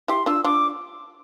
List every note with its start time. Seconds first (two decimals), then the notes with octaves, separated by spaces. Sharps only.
0.08 E4 G4 C6
0.26 D4 F4 E6
0.44 D4 F4 D6